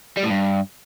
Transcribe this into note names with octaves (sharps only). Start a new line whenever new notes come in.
G3
A2
G2